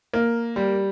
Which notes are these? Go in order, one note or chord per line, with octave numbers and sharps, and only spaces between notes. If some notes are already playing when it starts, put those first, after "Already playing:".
A#3
G3